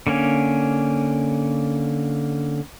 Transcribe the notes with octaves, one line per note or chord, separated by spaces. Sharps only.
D3 A#3 C#4